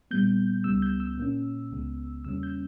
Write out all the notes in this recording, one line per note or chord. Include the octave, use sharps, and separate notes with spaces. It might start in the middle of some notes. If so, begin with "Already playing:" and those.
A#2 G3 B3 G6
C#2 C#3 G3 B3 E6
G6
E6
A#2 A#3 C#4
C#2 C#3 G#3 B3
E2 C#3 G3 A#3 C#4 E6
G6